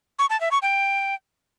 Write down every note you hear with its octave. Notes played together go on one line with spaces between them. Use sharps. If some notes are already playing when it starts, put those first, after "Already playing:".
C#6
A5
E5
C#6
G5